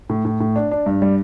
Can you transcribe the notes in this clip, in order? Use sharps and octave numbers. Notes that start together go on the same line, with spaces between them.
A2
A2
A2
D4
D4
G2
G3